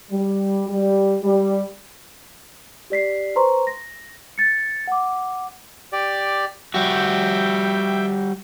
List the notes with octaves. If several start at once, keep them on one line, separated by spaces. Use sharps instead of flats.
G3
G3
G3
G4 D5 B6 C7
B4 C5 A#5 C6 C#6
A#6
G#6 A6 C#7
F#5 D6
G4 D5
G3 F#4 E5 G5